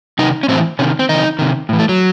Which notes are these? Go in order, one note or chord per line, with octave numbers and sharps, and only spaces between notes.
C3 D#3 D#4
C#4
A2 E3 C4
C3 D#3 C#4
C4
C3 D#3 D#4
C3 D#3
A2 E3
A3
F#3